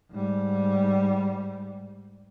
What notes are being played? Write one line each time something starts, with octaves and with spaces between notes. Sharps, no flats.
G#2 G3